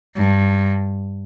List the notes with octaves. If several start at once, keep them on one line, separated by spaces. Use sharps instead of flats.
G2